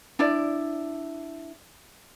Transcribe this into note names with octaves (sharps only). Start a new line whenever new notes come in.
D4 E4 D5